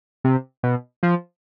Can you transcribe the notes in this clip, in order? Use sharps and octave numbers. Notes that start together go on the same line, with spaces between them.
C3
B2
F3